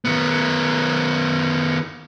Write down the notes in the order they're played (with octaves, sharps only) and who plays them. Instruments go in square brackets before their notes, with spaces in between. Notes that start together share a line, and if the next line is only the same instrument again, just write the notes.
[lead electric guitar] D#3 B3